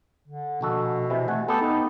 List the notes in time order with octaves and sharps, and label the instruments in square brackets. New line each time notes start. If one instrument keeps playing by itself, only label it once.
[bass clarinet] D3
[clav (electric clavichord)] A#1 F#4 A4 [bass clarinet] B2
[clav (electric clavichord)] C3 E3
[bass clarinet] A3 [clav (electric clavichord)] F#5 G#5
[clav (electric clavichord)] B3 G4 [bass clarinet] A4
[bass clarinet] D#4